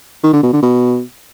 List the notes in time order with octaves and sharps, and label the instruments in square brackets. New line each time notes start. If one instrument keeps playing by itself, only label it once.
[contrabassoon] D#3
D3
B2
D3
B2